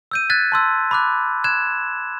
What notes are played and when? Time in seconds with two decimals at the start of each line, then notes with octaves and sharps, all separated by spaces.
0.11 E6 G6 D#7
0.30 F#6 G#6 A6 B6
0.52 A5 C6 E6
0.91 B5 D6 F#6
1.44 F#6 G#6 E7